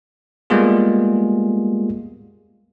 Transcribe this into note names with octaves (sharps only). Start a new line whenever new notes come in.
G3 G#3 A#3 B3 F4 G#4